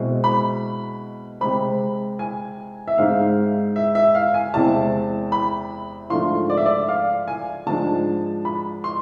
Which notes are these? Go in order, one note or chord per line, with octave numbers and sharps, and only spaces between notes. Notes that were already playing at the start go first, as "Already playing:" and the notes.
Already playing: B2 G#3 C4 E4
B5
C3 G#3 C4 B5
G#5
E5
G#2 G#3 C4 F5
E5
E5
F5
G#5
E2 C3 G#3 C4 E4 A5
B5
G#2 F3 A3 D4 F4 C6
D5
E5
D5
F5
G#5
G#2 F3 G#3 D4 A5
B5
C6